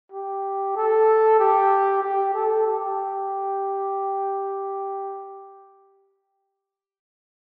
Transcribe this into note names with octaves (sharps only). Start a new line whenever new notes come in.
G4
A4
G4
G4
A4
G4